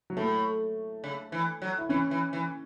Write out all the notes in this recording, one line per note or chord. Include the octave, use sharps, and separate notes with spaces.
F#3
A2 A3
C#3
E3
F#3
E4
E3 C#4
E3
E3